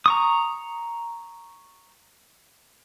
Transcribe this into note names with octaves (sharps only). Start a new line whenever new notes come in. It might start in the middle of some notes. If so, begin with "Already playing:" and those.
A#5 C#6 D#6